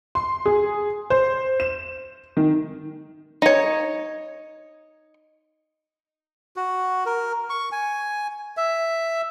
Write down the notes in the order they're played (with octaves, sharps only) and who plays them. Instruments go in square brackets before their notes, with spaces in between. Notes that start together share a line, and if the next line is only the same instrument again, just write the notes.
[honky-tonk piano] C6
G#4
C5
E7
D#3
[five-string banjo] D#4 C#5
[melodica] F#4
A#4
C#6
G#5
E5